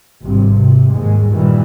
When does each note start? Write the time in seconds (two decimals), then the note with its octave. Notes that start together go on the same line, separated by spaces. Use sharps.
0.21 G#1 G2 C3
0.57 C3
0.91 D#2 G#2 G#3
1.30 G2 A#2 D#3 E3 G3